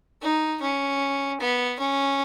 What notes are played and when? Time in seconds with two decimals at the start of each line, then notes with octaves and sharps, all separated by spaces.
0.22 D#4
0.61 C#4
1.40 B3
1.80 C#4